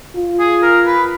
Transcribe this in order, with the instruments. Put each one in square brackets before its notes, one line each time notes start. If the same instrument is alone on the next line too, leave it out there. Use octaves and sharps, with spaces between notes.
[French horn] F4
[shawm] G#4
A#4
B4